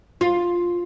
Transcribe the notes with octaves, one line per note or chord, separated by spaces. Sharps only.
F4